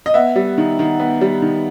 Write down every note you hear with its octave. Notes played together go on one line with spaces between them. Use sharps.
D#5
B3 E5
G3
D#3
D#3
B3
G3
D#3